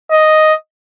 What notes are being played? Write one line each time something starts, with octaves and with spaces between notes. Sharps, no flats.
D#5